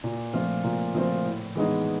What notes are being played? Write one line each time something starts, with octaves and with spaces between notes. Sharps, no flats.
A#2
F3 A3 C4 F4
A#2
F3 A3 C4 F4
A2
E3 G#3 B3 D#4